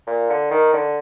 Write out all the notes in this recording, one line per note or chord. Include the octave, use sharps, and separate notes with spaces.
A#2
D3
D#3
D3